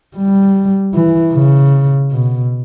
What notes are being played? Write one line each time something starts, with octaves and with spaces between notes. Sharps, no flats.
G3
E3
C#3
B2